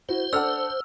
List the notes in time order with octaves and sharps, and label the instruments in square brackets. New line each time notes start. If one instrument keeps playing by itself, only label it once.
[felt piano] E4 F#4 [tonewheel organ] C5
[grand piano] D4 A4 [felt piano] F#5 F6 [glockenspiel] E6